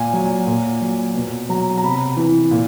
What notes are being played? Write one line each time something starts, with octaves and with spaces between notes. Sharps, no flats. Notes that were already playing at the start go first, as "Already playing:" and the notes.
Already playing: A#2 G#5
F#3
A#2
F#3
B2
F#3 A#5
A#5
C3 B5
E3
A#2